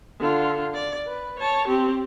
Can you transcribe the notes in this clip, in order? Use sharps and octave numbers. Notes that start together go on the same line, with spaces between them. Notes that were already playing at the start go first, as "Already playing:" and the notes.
D3 F4
D5
B4
C#5 A5
C4 G4